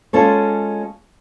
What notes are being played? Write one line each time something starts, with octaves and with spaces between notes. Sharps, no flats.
G#3 C#4 F4 A4 C#5